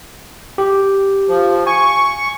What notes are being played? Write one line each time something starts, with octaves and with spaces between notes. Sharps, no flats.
G4
F3
G#5 C#6